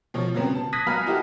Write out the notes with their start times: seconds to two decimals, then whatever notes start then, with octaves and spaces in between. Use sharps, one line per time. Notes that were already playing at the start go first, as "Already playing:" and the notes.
0.14 B2 F3 C#5
0.34 C#3 F#3 B3 C4
0.55 A5
0.73 D#6 F#6 G#6 A#6 B6 D#7
0.86 F#3 B3 F5 G#5 B5 F6
1.06 D#4 E4 F#4 G4 A4